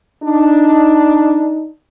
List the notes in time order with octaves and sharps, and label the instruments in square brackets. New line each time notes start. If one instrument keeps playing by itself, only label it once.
[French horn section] D4 D#4